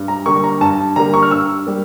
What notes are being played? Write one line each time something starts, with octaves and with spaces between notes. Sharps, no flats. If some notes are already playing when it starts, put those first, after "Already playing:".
Already playing: G2
A#5
D3 G3 A#3 C#6
A#5
G2 A5
D3 G3 A#3 A#5
C#6
F6
G2 E6
G3 A#3